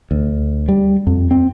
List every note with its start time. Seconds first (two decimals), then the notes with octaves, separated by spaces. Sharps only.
0.11 D2
0.69 G3
1.07 F2
1.31 C4